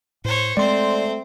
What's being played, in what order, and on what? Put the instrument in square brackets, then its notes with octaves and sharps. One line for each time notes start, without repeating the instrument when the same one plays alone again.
[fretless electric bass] A2 [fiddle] C5 C#5
[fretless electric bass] G#3 [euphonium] A3 [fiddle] C4 C5 [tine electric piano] D5 C6